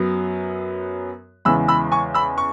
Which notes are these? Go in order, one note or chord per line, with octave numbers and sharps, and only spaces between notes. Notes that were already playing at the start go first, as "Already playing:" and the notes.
Already playing: F#2 F#3 B3
E2 C#3 E3 G#3 B3 B5 E6
B5 E6
G#5 C#6
B5 E6
C#6